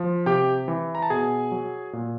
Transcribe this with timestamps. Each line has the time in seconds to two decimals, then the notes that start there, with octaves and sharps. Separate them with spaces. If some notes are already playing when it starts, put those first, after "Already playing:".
Already playing: F3
0.26 C3 G4 G5
0.68 E3
0.95 A#5
1.02 A5
1.10 B2 G#4 G#5
1.52 F#3
1.93 A#2